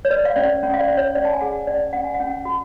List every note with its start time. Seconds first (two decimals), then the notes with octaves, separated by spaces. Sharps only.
0.05 C#5
0.11 B4 D5
0.25 F5
0.36 C#4 D5
0.63 C#4
0.74 F5
0.80 D5
0.88 C#4
0.97 C#5
1.15 C#4 D5
1.25 A5
1.33 G#5
1.40 G#4 F#5
1.67 C#4 D5
1.93 C#4 F#5
2.04 G#5
2.14 F#5
2.20 C#4
2.45 F#4